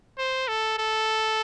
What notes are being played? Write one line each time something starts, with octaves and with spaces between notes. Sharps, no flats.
C5
A4
A4